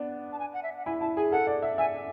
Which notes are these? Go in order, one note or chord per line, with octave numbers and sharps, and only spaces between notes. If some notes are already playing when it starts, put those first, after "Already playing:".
Already playing: B3 D4
A5
G#5
F#5
E5
F#5
E4 G#5
E4 A5
G#4 G#5
A4 F#5
D5
E5
E5 G#5